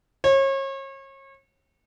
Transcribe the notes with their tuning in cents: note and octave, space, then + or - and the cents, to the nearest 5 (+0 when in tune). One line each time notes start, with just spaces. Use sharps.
C#5 -35